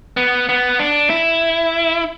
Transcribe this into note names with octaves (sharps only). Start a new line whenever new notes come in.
B3
B3
D4
E4